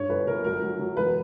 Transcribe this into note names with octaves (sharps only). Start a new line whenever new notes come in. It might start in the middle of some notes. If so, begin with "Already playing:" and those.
Already playing: G2 C#5
G1 B4
G1 A#4
F#3 A#4
F#3
F#3
E1 B4